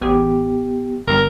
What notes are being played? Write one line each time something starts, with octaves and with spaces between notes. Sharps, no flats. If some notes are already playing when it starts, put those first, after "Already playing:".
A1 B3 G4 G#4
G1 G2 A#4